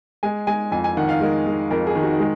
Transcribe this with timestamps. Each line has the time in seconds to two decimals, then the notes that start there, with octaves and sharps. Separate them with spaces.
0.23 G#3 G#5
0.47 G#3 G#5
0.71 F2 G#5
0.84 G#5
0.97 D#3 F#5
1.09 F5
1.21 G#3 A#4
1.46 G#3
1.71 F2 A#4
1.87 G#4
1.95 D#3
2.03 F#4
2.20 G#3